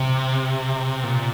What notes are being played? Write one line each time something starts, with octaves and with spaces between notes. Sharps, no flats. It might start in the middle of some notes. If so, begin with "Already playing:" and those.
Already playing: C3
A#2